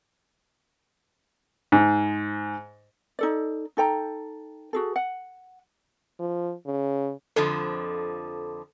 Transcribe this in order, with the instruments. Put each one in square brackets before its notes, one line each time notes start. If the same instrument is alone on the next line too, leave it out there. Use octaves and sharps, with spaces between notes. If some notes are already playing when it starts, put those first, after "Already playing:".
[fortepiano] G#2
[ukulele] D#4 A4 D5
D#4 A4 G5 A#5
F#4 G#4 A4
F#5
[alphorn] F3
C#3
[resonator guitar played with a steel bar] F2 D3 F3 [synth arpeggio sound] A4